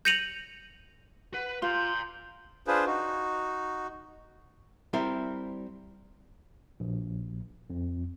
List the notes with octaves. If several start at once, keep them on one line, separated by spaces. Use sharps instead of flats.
G6 A#6 C#7 D#7 F7 F#7
B4 F#5
F4 A#5 C6 G6
D4 F4 G#4 B4 C5
D#4 F#4
G3 C4 E4 A#4
A#1
F2